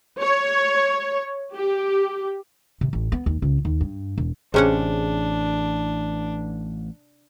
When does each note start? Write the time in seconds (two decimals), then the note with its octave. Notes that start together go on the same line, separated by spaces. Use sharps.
0.21 C#5
1.55 G4
2.81 C3
2.93 A1
3.12 B3
3.26 D#2
3.42 C#2
3.65 D#2
3.81 G2
4.18 E1
4.54 A1 C3 C#4 D4 G#4 C5 C#5 F#5